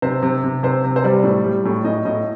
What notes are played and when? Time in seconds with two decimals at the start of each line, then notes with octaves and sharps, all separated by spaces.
0.02 C3 C5
0.23 C3
0.44 C3
0.63 C3 C5
0.84 C3
0.96 C5
1.04 G3 D5
1.24 A2
1.44 G3
1.65 A2
1.84 A2 D#5
2.05 A2 D#5